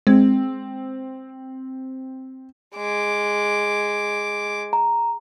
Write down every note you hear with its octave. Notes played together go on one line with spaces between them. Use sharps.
G#3 C4
G#3 D6
A#5